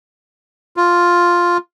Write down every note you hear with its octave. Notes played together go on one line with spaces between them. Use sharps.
F4